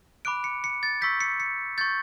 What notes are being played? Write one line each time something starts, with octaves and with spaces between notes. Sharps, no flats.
B5 D6 F#6 D7
C#7
C#7
A6
C#6 E6 G6 B6
C#7
C#7
C#6 G6 A6